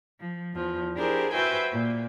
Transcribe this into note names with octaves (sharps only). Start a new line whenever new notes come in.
F3
E2 F3
D4 E4 G4 G#4 A#4 C5
F#4 B4 C5 E5 G5 G#5
A#2